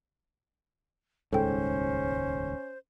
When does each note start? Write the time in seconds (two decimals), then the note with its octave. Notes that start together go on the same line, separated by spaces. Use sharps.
1.33 D#1 C#2 G#2 C#4 A4 C5 G5